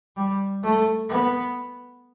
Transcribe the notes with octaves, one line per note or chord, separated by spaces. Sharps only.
G3
A3
B3